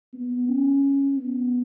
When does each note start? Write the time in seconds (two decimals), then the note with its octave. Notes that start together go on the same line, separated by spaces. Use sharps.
0.14 B3
0.49 C#4
1.19 B3